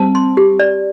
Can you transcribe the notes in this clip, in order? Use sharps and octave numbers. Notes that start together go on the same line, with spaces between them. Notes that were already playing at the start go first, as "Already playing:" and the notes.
Already playing: G3 C4 A5
C6
G4
D5